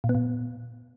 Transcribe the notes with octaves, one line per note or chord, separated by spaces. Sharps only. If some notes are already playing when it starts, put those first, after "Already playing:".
A#2
B3
A#2